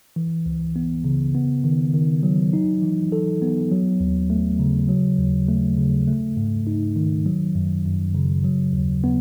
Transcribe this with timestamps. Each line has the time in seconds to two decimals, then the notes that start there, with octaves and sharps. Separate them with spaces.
0.16 E3
0.46 C#2
0.76 B3
1.05 C#3
1.35 B3
1.64 D#3
1.94 D#3
2.23 F#3
2.53 D#4
2.82 E3
3.12 A4
3.42 B3
3.71 F#3
4.00 D#2
4.30 A3
4.59 C#3
4.89 F#3
5.19 D#2
5.48 A3
5.78 C#3
6.08 A3
6.37 G#2
6.67 D#4
6.96 D#3
7.26 F#3
7.55 F#2
7.85 F#2
8.15 C#3
8.44 F#3
8.73 D#2
9.04 B3